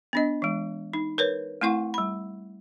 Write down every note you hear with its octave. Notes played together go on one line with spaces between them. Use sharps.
B3 D4 D#5
E3 G#3
D#4
A#4 B4 C#5
A3 C4 E4 F#5 C#6
G3 B5